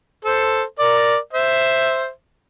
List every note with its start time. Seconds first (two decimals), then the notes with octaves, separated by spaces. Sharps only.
0.25 A4 C5
0.79 A#4 D5
1.33 C5 E5